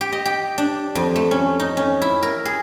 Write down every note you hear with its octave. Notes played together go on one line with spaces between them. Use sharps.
G4
D#5
G4
D4
F2
A3
C#4
D#4
C#4
E4
A#4
G#4